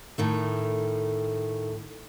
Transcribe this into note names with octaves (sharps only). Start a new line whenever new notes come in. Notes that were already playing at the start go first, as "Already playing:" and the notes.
A2 D#3 A3